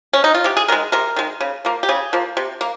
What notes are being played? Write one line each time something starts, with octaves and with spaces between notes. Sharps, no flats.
C#4
D#4
F4
C3 G4
G#4
D#3 G#3 A#4
C3 A#4
D#3 G#3
C#3
F3 A#3
G4
C#3 G#4
F3 A#3
C3
A#3